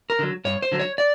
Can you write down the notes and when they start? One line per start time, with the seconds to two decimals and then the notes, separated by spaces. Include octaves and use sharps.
0.10 A#4
0.19 D3 F#3
0.45 G2 C#5
0.62 C5
0.72 D3 F#3
0.80 C#5
0.98 D5